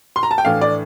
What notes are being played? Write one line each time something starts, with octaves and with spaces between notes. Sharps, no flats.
C6
A#5
A5
G5
A2 E3 A3 D4 F5
D5